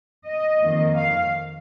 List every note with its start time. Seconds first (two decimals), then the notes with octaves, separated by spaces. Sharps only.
0.26 D#5
0.62 F2 D#3 A#3
0.96 F5